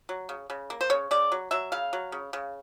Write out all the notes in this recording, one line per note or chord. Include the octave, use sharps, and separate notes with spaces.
F#3
C#3
C#3
A#3
C5
C#3 C#5
C#3 D5
F#3
F#3 E5
C#3 F5
F#3
C#3
C#3